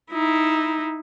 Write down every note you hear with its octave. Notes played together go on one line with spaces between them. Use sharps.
D#4 E4